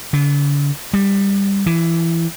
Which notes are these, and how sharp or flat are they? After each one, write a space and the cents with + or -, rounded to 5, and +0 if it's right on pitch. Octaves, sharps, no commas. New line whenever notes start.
D3 -40
G3 +15
E3 +15